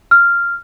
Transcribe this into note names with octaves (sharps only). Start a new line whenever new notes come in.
F6